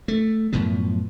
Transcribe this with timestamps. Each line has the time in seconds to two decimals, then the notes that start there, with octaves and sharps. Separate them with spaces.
0.08 A3
0.53 F#2 A2 F3 B3